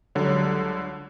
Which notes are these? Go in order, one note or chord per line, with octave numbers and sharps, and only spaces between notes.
C#2 D3 F#3 G3 C#5